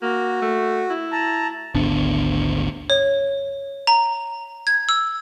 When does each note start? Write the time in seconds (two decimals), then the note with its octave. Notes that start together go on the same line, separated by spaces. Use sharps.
0.02 A#3 F#4
0.42 A3
0.90 E4
1.12 A5 A#5
1.75 G#1 D2 B3 D4
2.90 C#5
3.87 A#5
4.67 G#6
4.89 E6